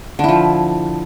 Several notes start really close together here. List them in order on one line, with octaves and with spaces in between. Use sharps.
D3 E4 F3